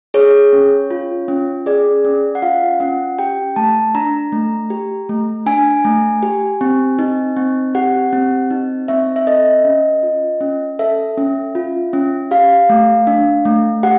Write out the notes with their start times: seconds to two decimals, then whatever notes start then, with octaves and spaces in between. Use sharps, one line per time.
0.14 G#4 C#5
0.53 C#4
0.91 F4
1.28 C#4
1.66 G#4 D5
2.05 C#4
2.35 F#5
2.42 F4 F5
2.80 C#4 F#5
3.19 G4 G5
3.56 A3 A5
3.95 D4 A#5
4.32 A3
4.70 G4
5.09 A3
5.46 D4 G#5
5.84 A3
6.23 G4
6.61 C4
6.99 D#4
7.37 C4
7.75 G4 F#5
8.13 C4
8.51 D#4
8.88 C4 E5
9.16 E5
9.27 A4 D#5
9.65 C#4
10.03 F4
10.41 C#4
10.79 A4 E5
11.18 C#4
11.55 F4
11.93 C#4
12.31 G4 F5
12.69 A3
13.07 D4
13.45 A3
13.83 G4 F#5